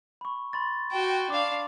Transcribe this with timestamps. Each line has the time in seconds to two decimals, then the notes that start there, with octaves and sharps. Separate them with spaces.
0.21 B5 C#6
0.53 B5 C6 A6
0.91 F#4 G5
1.30 D4 F5 D6